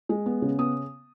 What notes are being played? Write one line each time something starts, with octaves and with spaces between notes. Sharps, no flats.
G#3
B3
C#3
B3 D#6